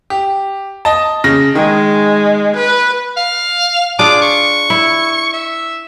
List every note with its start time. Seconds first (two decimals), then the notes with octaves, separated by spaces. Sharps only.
0.10 G4
0.85 D#5 A5
1.24 C#3 A#6
1.55 D#3 G#3
2.56 B4
3.17 F5
3.99 D4 F4 G#4 D6
4.22 C#6
4.70 E4
5.33 E5